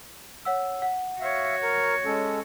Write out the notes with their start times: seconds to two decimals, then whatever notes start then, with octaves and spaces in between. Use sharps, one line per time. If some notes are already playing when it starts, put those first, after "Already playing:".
0.45 C#5 F#5 E6
0.82 F#5
1.21 F#4 C#5 E5 F5
1.63 A#4 A#5
2.05 G#3 C#4 A4